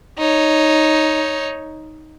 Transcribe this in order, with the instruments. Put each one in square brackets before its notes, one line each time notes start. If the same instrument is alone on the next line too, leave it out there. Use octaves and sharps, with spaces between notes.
[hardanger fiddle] D#4 C#5